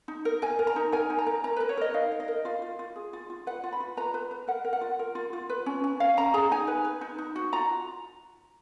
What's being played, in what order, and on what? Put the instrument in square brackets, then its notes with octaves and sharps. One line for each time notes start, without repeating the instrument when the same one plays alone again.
[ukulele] D#4
A#4
A#4 G#5
A#4
A#5
D#4
A#4 G#5
D#4
A#5
A#4
A#4 A#5
A#4 B4
C#5
A#4 D#5
D#4 F5
A#4
D#5
A#4
F4 F5
F4
F4
G#4
F4
F4
B4 F#5
F4
B5
F4
B4 A#5
B4
B4
A#4 F#5
A#4
F#5
F4
A#4
F4
F4
B4
C#4
C#4
C#4 F5
C#4 A#5
G#4 A#5
D#4 G#5
B4
B4
D#4
D#4
F#4
F4 A#5